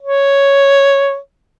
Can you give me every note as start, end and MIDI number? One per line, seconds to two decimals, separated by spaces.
0.01 1.18 73